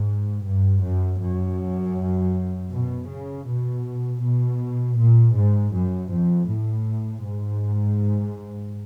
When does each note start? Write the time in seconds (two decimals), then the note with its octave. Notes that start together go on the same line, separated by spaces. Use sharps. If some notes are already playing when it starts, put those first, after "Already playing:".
Already playing: G#2
0.44 G2
0.82 F#2
1.19 F#2
2.71 B2
3.08 C#3
3.46 B2
4.21 B2
4.97 A#2
5.34 G#2
5.73 F#2
6.10 F2
6.47 A2
7.23 G#2